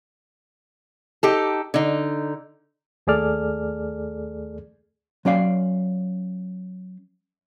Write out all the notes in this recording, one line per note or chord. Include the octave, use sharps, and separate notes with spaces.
D#4 G4 A4
D3 D#4
D#2 A3 G#4 A4 D5 F6
F#3 C#4 D5 F5